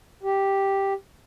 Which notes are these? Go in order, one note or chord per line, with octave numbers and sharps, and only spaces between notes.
G4